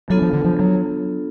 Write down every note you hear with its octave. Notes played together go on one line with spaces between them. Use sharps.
F#3 B3 D4 F4 A4
F3
D3
F3
F#3